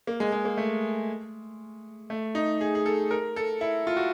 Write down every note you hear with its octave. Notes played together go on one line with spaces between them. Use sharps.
A#3
G#3
G#3
A#3
A3
A3
D#4
G#4
G#4
A4
A#4
A4
E4
F4
F#4